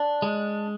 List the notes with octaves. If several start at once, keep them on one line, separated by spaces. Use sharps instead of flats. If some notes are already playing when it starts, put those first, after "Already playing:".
Already playing: D4
G#3